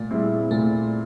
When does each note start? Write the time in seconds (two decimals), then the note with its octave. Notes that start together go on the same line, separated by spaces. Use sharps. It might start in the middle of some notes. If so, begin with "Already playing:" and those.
Already playing: A#2 A3
0.11 G3 C4 E4 G#4
0.51 A#2 A3